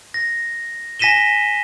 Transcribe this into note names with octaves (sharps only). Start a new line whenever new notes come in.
A#6
G#5 A#6 B6 D#7 E7 G7